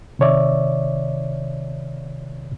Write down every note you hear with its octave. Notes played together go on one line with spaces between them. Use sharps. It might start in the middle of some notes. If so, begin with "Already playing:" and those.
C3 D#3 C#5 D5 E5